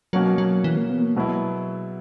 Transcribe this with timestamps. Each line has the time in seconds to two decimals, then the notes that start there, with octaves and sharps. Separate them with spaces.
0.13 B2 F#3 A#3 C#4 F#4 A#4
0.38 F#3
0.64 E3
0.77 A#3
0.90 B3
1.03 A#3
1.16 B2 F#3 G#3 B3 E4